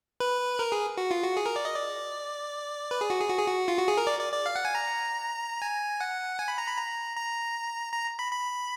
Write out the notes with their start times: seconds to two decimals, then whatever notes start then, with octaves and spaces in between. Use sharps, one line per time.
0.20 B4
0.59 A#4
0.72 G#4
0.97 F#4
1.11 F4
1.24 F#4
1.37 G#4
1.46 A#4
1.56 D5
1.65 D#5
1.75 D5
2.91 B4
3.01 G#4
3.10 F#4
3.20 G#4
3.29 F#4
3.38 G#4
3.47 F#4
3.68 F4
3.79 F#4
3.88 G#4
3.98 A#4
4.07 D5
4.19 D5
4.33 D5
4.46 F5
4.56 F#5
4.65 G#5
4.75 A#5
5.62 G#5
6.00 F#5
6.39 G#5
6.48 B5
6.58 A#5
6.68 B5
6.78 A#5
7.16 A#5
7.93 A#5
8.19 B5
8.32 B5